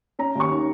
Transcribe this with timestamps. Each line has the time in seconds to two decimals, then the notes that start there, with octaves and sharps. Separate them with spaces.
0.19 C#4 A#5
0.35 D#2 C#6
0.51 D#3